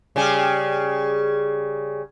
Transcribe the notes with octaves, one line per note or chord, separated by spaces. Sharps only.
C#3 G3 G#4